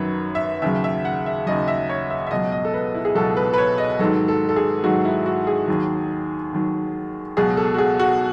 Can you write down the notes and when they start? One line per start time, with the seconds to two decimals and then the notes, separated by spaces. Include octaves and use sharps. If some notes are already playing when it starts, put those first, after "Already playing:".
Already playing: F#2 D#3 F#3 B4 C#5
0.35 E5
0.62 D#2 C#3 F#3 E5
0.84 E5
1.05 F#5
1.26 E5
1.46 D#2 C#3 F#3 D#5
1.68 E5
1.90 C#5
2.10 E5
2.27 E5
2.31 C#2 B2 F#3 D#5
2.52 D#5
2.65 A4
2.74 B4
2.94 E4
3.05 G#4
3.15 C#2 B2 F#3 A4
3.37 B4
3.53 B4
3.58 C#5
3.78 D#5
3.99 G#2 D#3 F#3 A4
4.28 A4
4.49 A4
4.56 G#4
4.83 G#2 D#3 F#3 F#4
5.05 E4
5.26 F#4
5.47 G#4
5.68 D#2 D#3 F#3
6.53 D#2 D#3 F#3
7.37 C#2 B2 F#3 G#4
7.57 A4
7.74 F#4
7.78 G#4
7.99 F#4